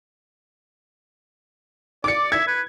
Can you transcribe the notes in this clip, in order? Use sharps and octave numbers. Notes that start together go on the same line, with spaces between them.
D5 D6 C#7
E5 G#6
B4